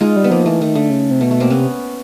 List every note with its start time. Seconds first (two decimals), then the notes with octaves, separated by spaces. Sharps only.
0.01 G#3 D#4 F4
0.16 G3
0.24 B3
0.30 F3 A#3
0.46 E3 A3
0.62 D#3 A3
0.75 D3 A3
0.90 C#3
1.11 C3
1.21 B2 A3
1.31 A3
1.40 A#3 C4
1.50 C3 B3 C#4